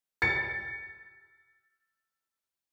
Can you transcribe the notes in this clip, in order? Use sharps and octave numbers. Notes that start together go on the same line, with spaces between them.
A6 C#7